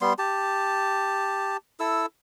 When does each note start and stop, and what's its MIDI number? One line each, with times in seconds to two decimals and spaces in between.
0.01 0.13 55
0.01 0.13 59
0.01 0.13 84
0.19 1.57 67
0.19 1.57 81
1.80 2.06 64
1.80 2.06 69
1.80 2.06 88